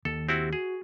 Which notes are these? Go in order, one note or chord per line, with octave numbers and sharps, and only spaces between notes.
D#2 D#3 A4
C4 E4 F#4 G4
F#4 G#4